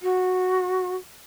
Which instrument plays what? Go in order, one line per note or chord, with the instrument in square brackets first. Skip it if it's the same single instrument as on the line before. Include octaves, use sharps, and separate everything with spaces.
[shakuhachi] F#4